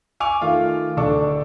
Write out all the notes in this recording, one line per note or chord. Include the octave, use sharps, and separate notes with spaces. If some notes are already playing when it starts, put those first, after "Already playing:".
G#5 C#6 D6 F7
D#3 A3 F4
D1 D4 A4 C#6 D6